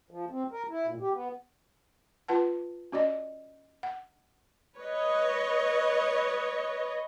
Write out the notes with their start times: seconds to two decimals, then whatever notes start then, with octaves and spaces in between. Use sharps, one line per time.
0.11 F3
0.30 C4
0.52 A#4
0.70 E4
0.87 A#2
1.00 G4
1.13 B3
2.28 F4 B4 F#5 A5
2.92 C#4 F#4 D5 D#5
3.83 F#5
4.78 B4 C#5 D#5